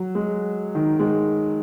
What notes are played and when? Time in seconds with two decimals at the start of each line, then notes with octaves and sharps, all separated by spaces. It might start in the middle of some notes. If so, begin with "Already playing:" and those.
Already playing: F#3
0.15 G#3
0.75 D#3
0.99 G#3